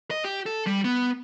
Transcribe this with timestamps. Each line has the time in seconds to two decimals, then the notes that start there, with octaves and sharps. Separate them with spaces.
0.11 D#5
0.25 G4
0.46 A4
0.67 G3
0.84 B3